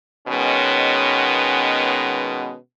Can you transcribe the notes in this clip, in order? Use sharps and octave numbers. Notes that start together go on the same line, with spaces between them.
B2 D#3 G#3 B3 C#4